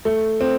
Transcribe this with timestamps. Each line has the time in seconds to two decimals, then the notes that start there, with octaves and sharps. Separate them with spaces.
0.05 A3
0.41 C4